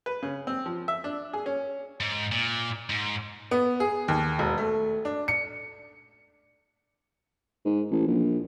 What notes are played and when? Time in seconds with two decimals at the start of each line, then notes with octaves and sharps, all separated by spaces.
0.06 B4
0.22 C#3
0.47 C4
0.66 F3
0.88 E5
1.04 D4
1.33 G#4
1.46 C#4
2.00 G#2
2.32 A#2
2.89 G#2
3.51 B3
3.80 G#4
4.08 D#2
4.39 E1
4.58 A3
5.05 D4
5.28 C#7
7.65 G#2
7.91 A1
8.07 A#1